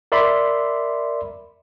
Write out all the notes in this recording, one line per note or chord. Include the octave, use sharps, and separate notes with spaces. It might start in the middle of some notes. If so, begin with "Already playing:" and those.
A#4 D5 E5 B5 C6